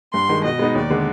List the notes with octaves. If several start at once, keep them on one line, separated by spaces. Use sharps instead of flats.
G2 C6
D#3 G#3
B2 D#5
G#3 B3 D#4
D#2 D5
D3 G#3